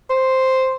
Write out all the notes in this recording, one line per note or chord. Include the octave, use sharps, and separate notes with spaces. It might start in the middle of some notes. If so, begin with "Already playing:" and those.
C5